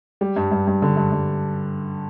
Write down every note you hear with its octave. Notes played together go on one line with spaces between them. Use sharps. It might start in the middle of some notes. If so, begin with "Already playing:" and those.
G3
G2
G2
G2
D3
G2
G2